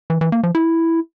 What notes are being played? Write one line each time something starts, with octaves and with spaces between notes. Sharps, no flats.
E3
E3
A#3
F3
E4